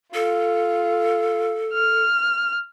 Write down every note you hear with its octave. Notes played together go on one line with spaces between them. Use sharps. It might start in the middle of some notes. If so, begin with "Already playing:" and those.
F4 A4
F6